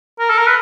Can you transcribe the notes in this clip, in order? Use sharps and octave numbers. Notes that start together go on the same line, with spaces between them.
A#4
A4
A#4
B4